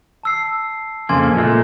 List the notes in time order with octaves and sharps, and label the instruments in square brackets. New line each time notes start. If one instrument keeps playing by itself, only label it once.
[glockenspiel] A5 E6 C7
[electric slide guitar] F2 C#3 A#3 [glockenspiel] G#5 C6 G#6
[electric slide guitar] A#2 G#3 A3